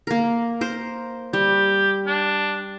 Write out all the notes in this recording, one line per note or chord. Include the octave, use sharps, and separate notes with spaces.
A#3 A#4
A#4 C5
G3 G4
D4